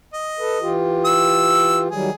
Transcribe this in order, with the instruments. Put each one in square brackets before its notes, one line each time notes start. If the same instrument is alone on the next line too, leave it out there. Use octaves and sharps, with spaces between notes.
[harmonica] D#5
[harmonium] A4 B4
E3 F4 G4
[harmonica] E6
[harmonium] D#3 F#3 G3 [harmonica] G#4